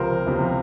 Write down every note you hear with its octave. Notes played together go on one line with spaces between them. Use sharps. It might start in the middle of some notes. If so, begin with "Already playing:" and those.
Already playing: C#2 C3 F3 A#4 C5
C#2 C3 F3